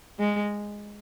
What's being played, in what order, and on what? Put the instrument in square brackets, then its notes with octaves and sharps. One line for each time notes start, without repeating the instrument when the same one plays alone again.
[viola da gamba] G#3